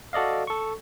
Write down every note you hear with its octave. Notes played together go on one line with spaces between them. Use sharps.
F#4 A4 D5 D#5 F5
A4 C#6